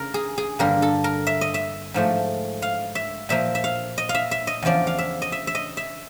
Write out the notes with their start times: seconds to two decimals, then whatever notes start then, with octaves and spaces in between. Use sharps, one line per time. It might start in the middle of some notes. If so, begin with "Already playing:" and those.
Already playing: C#3 A#4
0.14 G#4
0.38 G#4
0.59 G2 D3 G3 A#3 A#4
0.82 A4
1.04 A#4
1.27 E5
1.41 D#5
1.54 E5
1.94 G#2 F3 A3
2.62 F5
2.95 E5
3.29 A#2 F3 A#3 E5
3.55 E5
3.64 F5
3.98 D#5
4.09 F5
4.15 E5
4.31 E5
4.47 D#5
4.62 E2 C#3 F3 D5
4.87 F5
4.98 E5
5.22 D#5
5.32 E5
5.47 E5
5.55 D#5
5.77 E5